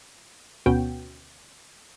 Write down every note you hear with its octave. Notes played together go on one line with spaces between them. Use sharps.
D2 B2 B3 C#4 F#4 G5